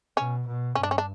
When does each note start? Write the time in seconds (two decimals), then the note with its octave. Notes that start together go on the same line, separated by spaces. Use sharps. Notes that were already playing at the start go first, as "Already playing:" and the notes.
0.17 B2 C#4
0.47 B2
0.75 G2 C#4
0.83 D4
0.91 C#4
0.98 D4